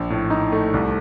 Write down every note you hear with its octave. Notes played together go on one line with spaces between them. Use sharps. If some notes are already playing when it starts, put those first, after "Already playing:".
Already playing: A#1
A2
D#4
A3
C2